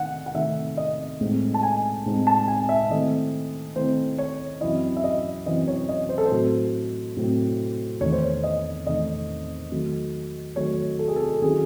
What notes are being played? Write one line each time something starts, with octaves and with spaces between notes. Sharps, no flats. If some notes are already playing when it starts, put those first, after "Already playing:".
Already playing: D#3 A3 D#4 F#5
F#5
D#3 A3 D#4 E5
D#5
A2 G#3 C4 D#4
A5
G#5
A2 G#3 C4 D#4
A5
G#5
E5
D#3 A3 C4 E4 D#5
D#3 A3 C4 E4 C5
C#5
F#2 E3 C4 E4 D#5
E5
D#5
F#2 E3 C4 E4 D#5
C#5
D#5
C5
A4
C5
A2 F#3 C4
A2 F#3 C4
E2 D#3 A3 D#4 C#5
C5
C#5
D#5
E2 D#3 A3 D#4 D#5
D#3 F#3 A3
D#3 F#3 A3 C#5
A4
G#4
A4
D#3 F#3 C#4 E4 G#4